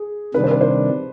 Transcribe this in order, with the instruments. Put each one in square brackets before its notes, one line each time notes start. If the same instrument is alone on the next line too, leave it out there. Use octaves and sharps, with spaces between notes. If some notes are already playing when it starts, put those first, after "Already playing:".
Already playing: [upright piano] G#4
[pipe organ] C3 D#3 G3 D4 [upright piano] B4
[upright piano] C5
B4
C5